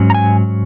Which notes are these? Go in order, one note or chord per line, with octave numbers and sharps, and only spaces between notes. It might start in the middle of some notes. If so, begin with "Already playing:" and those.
Already playing: G#2 F#3 C#4
A#5
G#5